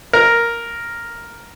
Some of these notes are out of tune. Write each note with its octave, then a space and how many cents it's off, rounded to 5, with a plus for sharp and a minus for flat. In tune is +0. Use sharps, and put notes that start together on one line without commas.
A#4 +0